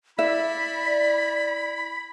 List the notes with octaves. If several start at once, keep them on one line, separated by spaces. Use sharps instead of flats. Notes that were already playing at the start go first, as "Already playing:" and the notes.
E4 D5 E5 B5